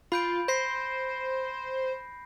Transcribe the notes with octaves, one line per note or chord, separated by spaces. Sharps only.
F4 B5 G6 D7
C5 G6 A#6 C7